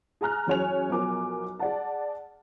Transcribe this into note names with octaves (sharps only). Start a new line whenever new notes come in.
G#4 G#5 A#5 F6 F#6
F#2 E3 G#4 C#5 G#5 F7
B1 F3 B3 A#4 G#5 D6
G#4 D5 F#5 A5